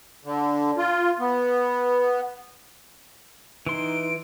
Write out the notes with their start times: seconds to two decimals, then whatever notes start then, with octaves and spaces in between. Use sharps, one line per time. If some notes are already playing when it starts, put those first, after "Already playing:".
0.25 D3
0.78 F4
1.19 B3
3.67 E3 D#4 C6 D7